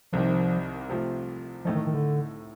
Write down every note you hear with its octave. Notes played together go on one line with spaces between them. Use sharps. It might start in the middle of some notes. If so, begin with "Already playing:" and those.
C2 C3 D#3 F3
C3 F3 A3
A2 F3 A3 D#4
D#3
D#3
D3